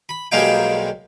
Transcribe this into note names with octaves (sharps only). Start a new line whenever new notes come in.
B5
B1 G3 G#3 A#3 F5 G5